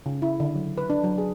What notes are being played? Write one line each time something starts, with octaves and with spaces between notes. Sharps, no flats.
C#3
E4
D3
F#3
B4
D4
F#3
G#4